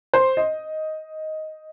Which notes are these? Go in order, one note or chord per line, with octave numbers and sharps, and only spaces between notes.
C5
D#5